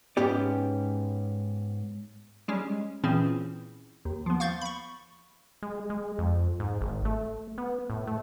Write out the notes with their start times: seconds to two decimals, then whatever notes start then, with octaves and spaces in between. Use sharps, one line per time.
0.17 G#2 B3 C#4 G4 D5
2.48 G3 G#3 C#4
3.04 A#2 E3 C4 C#4 E4 G#4
4.05 D#2
4.26 F3 B3
4.40 F5 C#6 G6 A6
4.61 B5 C#6
5.62 G#3
5.90 G#3
6.19 F2
6.60 G#2
6.81 G#1
7.05 A3
7.58 B3
7.90 A2
8.07 A3